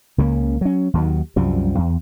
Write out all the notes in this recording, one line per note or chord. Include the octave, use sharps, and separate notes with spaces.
C#2 C#3 F3 A#3
F#3 C#4
D#2 D#3 F#3
C2 F#2 F3 G3
E2